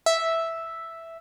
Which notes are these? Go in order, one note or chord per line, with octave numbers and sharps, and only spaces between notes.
E5